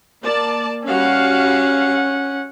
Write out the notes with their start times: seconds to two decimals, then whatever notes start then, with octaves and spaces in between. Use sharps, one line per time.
0.23 A#3 D5 A5
0.86 G3 C#4 F#4 F5 F#5